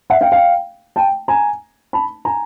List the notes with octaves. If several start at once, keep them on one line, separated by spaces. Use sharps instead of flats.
E5 F#5
F5 G5
F5 G5
G5 A5
G#5 A#5
A5 B5
G#5 A#5